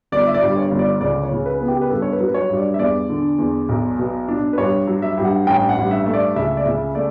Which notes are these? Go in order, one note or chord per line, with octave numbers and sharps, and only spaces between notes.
G1 D5
E5
D5
G2
C#5
G1
D5
C#2 D5
C#5
C#3
B4
B3
G4
B4
G2 A4
C#5
B4
F#3
B4
C#5
G2
D5
E5
E2 D5
D3
E2
B1
B2
D4
B4
G2 C#5
F#3
E5
G2
F#5
A1 G5
F#5
G2
E5
A3
D5
C#2 E5
D5
C#3 E5
A3 D5